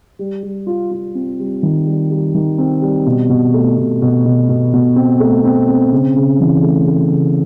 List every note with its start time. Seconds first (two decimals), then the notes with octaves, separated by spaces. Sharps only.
0.19 G3
0.43 G3
0.67 F4
0.91 F4
1.15 C4
1.39 G3
1.63 D#3
1.86 G3
2.10 G3
2.35 D#3
2.58 C4
2.82 G3
3.06 B2
3.29 B2
3.54 A3
3.78 B2
4.02 B2
4.26 B2
4.49 B2
4.74 B2
4.96 C4
5.20 A3
5.45 C4
5.69 C4
5.92 C#3
6.16 C#3
6.40 E3
6.63 A3
6.87 A3
7.11 C#3